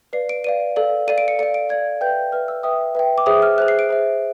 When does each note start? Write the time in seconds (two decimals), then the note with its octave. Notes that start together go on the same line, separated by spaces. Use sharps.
0.13 B4 D5 F5 C7
0.29 D7
0.44 B4 D5 F5 D#7
0.76 A4 D5 F5
1.08 A4 D5 F5 D#7
1.18 D7
1.28 C#7
1.39 A4 D5 F5 C#7
1.54 D7
1.69 A4 D5 F5 G#6
2.01 B4 E5 G5 G6
2.32 B4 E5 G5 F6
2.48 E6
2.63 B4 E5 G5 D#6
2.95 B4 E5 G5
3.18 D6
3.26 G#4 C5 E5 D#6
3.42 F6
3.58 G#4 C5 E5 F#6
3.68 C7
3.79 D7
3.89 G#4 C5 E5